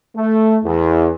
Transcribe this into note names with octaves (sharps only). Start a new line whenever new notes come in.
A3
E2